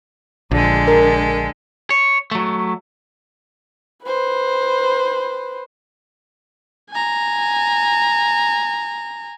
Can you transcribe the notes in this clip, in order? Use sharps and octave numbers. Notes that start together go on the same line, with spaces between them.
A#1 D3 G#3
A#4
C#5
F#3 A3
B4 C5
G#5 A#5